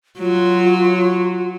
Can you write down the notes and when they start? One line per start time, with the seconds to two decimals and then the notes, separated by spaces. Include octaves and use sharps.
0.19 F#3 F4